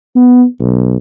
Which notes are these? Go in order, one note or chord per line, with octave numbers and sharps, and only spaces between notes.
B3
B1